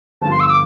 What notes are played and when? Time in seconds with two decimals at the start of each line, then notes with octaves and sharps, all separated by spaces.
0.22 G1 G2 F3 A5
0.31 C6
0.40 E6
0.50 D6